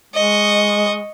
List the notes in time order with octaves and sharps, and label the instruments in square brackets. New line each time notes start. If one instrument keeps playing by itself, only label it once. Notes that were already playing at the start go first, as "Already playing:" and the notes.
[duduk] G#3 [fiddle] D#5 C#6